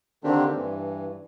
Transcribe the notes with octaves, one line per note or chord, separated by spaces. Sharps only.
D3 D#3 A#3 C4 D4 G4
G2 E3